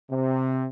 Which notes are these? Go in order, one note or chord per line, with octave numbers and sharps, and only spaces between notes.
C3